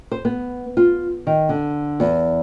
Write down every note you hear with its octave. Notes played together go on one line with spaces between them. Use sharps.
C5
B3
F4
D#3
D3
E2